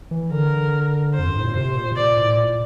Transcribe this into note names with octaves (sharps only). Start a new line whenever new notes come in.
E3
D3 A#4
F2 C5
G2
A2
A#2
C3 C5
A#2
C3
A#2 D5
A2
A#2